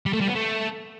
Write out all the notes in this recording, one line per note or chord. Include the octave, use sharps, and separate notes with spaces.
G3
A3
G3
B3
A3